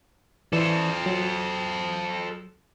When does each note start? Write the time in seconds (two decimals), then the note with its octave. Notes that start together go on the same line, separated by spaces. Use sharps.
0.53 E3 A4 C5 D5
1.06 F#3